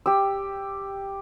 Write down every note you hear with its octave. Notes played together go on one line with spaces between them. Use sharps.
G4 E6